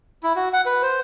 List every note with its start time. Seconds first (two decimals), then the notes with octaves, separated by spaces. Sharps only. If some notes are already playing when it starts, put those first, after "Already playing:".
0.23 E4
0.36 F#4
0.53 F#5
0.66 B4
0.82 C5